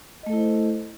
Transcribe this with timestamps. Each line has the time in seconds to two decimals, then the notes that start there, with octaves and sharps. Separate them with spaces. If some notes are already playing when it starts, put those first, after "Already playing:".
0.23 D#5
0.26 A3
0.30 A4
0.33 E4
0.36 C5